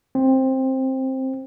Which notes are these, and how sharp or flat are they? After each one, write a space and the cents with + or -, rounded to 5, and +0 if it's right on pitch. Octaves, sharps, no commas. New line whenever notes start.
C4 +10